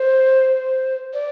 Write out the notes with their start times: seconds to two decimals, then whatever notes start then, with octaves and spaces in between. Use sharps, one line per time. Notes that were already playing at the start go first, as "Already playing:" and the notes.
Already playing: C5
1.14 D5